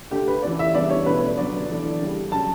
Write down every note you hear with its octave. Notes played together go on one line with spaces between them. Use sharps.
D3 A3 D4 G4
B4
E3 A3 C#4 D5
E5
C#3 E3 G3 B3 D4 D5
C#5
B2 A3 C#4 B4
D3 F#3 B3 D5
E3 A3 D4
C#3 G3 C#4
C#3 F#3 C#4 A5